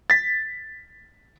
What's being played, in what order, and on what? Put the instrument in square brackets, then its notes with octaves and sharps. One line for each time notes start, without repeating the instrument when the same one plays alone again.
[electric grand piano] A6 B6